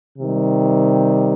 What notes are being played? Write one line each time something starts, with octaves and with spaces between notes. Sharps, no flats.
C3 D#3 G3